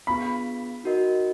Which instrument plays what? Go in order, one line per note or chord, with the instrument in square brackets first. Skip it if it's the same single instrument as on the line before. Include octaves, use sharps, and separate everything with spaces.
[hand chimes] B3 D4 F4 G#4 [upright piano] B5
[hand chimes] D#4 F#4 A#4 D#5